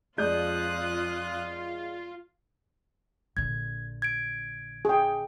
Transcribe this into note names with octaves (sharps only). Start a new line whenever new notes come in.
F2 G#3 F4 D5 D#6 F#6 G6
A#1 D3 G#6
G#6 D7
G#4 G5